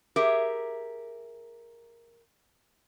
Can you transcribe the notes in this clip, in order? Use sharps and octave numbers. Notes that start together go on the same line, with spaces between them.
G4 G#4 A#4 E5